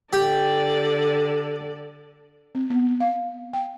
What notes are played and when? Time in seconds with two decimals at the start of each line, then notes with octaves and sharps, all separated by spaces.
0.13 D3 G4 D5
2.55 C4
2.70 B3
3.00 F5
3.53 G5